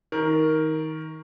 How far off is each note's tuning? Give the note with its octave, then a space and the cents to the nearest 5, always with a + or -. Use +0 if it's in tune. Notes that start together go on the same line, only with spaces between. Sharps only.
D#3 +25 A#4 +5